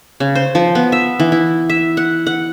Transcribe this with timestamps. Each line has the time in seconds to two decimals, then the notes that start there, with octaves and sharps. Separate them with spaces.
0.20 C#3
0.35 C5
0.55 F3
0.75 B3
0.92 E5
1.20 E3
1.32 E4
1.69 E5
1.97 F#5
2.27 F#5